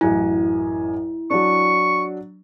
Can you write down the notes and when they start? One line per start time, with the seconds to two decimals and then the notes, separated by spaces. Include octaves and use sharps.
0.01 A1 F#2 E4 G#5
1.30 F#3 D4 C#6